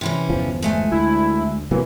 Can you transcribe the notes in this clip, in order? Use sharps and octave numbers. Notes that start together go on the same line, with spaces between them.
C3 E3 C#4
G1 E2 F3
G#3 A3 G#5
D2 E4
C3 E3 F#3 A#3